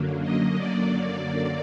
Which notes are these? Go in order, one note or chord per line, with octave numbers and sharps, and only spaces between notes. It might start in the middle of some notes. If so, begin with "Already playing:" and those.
Already playing: F#2 D3 F#3 A#3
D#5
D5